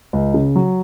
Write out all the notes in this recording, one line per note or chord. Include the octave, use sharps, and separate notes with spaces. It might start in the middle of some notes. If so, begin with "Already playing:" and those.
C#2
C#3
F#3